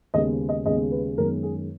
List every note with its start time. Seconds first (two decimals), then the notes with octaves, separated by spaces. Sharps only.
0.14 D#2 C#3 G#3 B3 D#5
0.49 D#5
0.65 D#2 C#3 G#3 B3 D#5
0.92 B4
1.17 F#2 D#3 G#3 B3 A#4
1.43 G#4